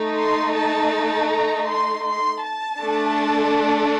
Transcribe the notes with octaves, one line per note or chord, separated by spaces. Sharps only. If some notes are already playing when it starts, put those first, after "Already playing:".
Already playing: A3 D#4 A4
C6
A5
A#5
C6
C6
A5
A3 D4 A4